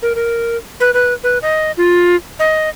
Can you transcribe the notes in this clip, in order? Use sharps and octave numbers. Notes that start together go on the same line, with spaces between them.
A#4
A#4
B4
B4
B4
D#5
F4
D#5